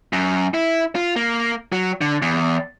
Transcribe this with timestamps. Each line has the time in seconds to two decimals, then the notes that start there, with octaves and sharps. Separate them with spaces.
0.13 F#2
0.54 E4
0.95 F4
1.16 A#3
1.72 F#3
2.01 D3
2.22 E2